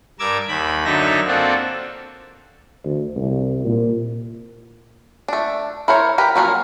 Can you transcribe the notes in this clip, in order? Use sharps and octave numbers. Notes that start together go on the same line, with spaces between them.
G2 A#4 D6 E6 G#6
D#2 B5
F#2 D3 D#4 E5 A#6
A#3 C4 D4 F4 F#4 A4
D2
C2
A#2
A3 D4
E4 A#4 C5 C#5
G4 A#4 B4
F3 F#3 A#3 C#4